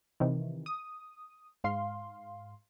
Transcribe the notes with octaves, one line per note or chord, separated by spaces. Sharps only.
C3 D#3 E3
D#6
G#2 F5 C6